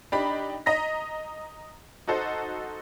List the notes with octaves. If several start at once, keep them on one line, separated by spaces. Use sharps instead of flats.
D4 D#4 G4 B5
D#5 A#5 A#6 B6
D#4 F#4 A4 C5